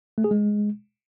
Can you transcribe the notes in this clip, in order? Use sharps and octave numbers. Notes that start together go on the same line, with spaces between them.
A3
G#4
G#3